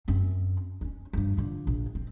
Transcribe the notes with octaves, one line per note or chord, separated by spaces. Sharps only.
F#2 C4
C#4 D4
G2 F3
D3 F3
A#1
C4